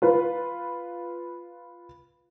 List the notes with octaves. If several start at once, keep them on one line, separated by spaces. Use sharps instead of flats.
F4 B4